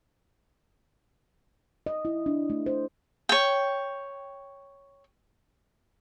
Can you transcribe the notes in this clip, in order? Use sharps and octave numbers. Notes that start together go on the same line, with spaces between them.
D#5
E4
D4
A3
C5
C#5 G5